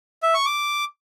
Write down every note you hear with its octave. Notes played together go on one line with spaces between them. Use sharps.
E5
C#6
D6